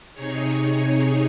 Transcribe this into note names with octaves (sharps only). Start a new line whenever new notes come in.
C3 D#4 G#4 C#5